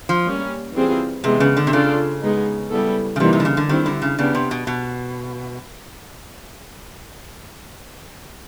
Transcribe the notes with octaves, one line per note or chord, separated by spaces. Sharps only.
F3
G3 A#3 C#4
E3 G3 C4 F4 G#4
C3 E3 G#3 B3
C#3
D3
C3
C#3 D4 F4 A4 D5
G#3 B3 D#4
G3 B3 E4 A4
C#3
C3 E3 G3 A#3 D#4
C3
D3
C#3
D3
D#3 G3 C4 E4
D3
C#3
C#3 B3 D4 G4
C3
B2
B2